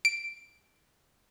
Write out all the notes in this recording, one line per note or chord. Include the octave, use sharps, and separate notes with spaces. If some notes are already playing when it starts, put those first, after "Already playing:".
D7